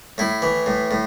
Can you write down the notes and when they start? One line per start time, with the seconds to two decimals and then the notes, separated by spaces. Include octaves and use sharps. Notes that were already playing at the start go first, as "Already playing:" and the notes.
0.18 A2 E4
0.42 E3
0.66 A2
0.91 A2